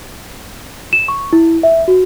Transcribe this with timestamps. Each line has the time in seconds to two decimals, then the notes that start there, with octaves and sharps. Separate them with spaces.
0.93 E7
1.08 C#6
1.33 E4
1.63 E5
1.88 F#4